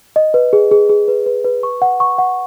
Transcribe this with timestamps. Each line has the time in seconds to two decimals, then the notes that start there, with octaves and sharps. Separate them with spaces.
0.16 D#5
0.34 B4
0.53 G#4
0.71 G#4
0.89 G#4
1.08 B4
1.26 B4
1.45 B4
1.63 C#6
1.82 F#5
2.00 C#6
2.18 F#5